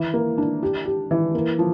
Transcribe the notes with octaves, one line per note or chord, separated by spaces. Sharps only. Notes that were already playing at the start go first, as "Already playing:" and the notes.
Already playing: E3
A#3
D4
G4
G4
E3
A#3
F3